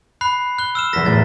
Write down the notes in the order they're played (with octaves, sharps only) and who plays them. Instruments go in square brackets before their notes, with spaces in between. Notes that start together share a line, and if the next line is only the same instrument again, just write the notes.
[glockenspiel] B5 F#6 C7
F#6 G7
E6 F6 E7
[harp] F#1 E2 A4 [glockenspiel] A#6 B6
[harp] A1 E2 A2 [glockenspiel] A6